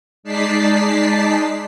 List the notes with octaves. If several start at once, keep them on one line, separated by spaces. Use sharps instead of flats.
G#3 D#4 D5 A5 B6 C7